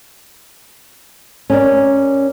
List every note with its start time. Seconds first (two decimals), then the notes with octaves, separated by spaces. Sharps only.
1.50 C#4 A#4 D5